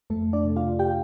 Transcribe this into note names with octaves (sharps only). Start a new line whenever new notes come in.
F2 A3 A4
D4 D5
C3 A3
F4 F5
G4 G5